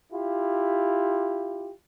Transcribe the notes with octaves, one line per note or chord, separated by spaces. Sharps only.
E4 F4 G4